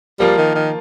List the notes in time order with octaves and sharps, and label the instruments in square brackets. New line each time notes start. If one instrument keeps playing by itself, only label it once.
[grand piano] F3 A#3 F4 A#4 [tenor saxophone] G3
[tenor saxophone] D#3
D#3